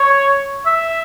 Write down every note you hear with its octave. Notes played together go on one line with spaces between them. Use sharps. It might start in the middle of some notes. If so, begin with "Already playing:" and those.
Already playing: C#5
E5